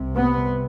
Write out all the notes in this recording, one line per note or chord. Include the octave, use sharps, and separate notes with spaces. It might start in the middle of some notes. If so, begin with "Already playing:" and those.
Already playing: C2 C3
B3